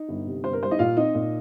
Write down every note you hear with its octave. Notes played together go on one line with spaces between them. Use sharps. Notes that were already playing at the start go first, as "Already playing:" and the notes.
Already playing: D#4
G1
C3
G1 C5
A#4
G3 C5
D#4 D#5
A#2 F4 F5
C4 D#4 D#5
A#2